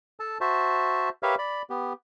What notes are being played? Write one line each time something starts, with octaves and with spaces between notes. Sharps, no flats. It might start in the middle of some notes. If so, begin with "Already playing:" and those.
A4 A5
F#4 C5 E5 A5
G4 A#4 B4 C#5 E5 F5
D5 B5
B3 G4